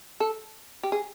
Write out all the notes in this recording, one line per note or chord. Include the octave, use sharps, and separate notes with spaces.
A4
G4
G#4